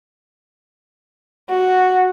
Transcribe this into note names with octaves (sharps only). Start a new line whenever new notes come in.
F#4